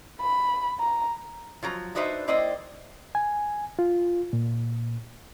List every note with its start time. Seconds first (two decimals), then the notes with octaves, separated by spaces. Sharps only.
0.20 B5
0.80 A#5
1.63 F3 F#3 A#5
1.95 D4 D#4 F#4 B4 C5 E5
2.28 A#3 E4 C5 D5 D#5 G5
3.15 G#5
3.79 F4
4.33 A#2